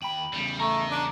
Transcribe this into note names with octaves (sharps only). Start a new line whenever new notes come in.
D#2 G5 B5 F#7
E2 C#3 G3
A3 A#4 D#5 A#5
D4